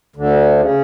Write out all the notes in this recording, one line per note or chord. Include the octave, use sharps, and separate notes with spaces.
D2 D3
C#3